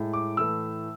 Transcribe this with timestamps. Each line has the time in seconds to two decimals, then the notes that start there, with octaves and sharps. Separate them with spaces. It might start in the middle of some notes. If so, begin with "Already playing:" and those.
Already playing: A2 G#3
0.13 D6
0.37 A2 E3 A3 E6